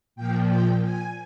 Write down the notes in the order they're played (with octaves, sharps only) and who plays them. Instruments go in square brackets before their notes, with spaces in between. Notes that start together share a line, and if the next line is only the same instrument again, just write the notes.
[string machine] A#2 F3 G5
G5
G#5